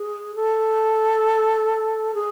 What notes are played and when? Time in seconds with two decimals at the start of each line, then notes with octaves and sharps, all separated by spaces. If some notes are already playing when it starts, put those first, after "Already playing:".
Already playing: G#4
0.35 A4
2.14 G#4